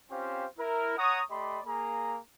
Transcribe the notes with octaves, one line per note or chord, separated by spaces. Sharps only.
C4 C#4 F4 G4 C5 F5
E4 A#4
C#5 F#5 A#5 C#6 D#6
A3 G4 D5 D#5 B5 C6
A#3 G#4 A#5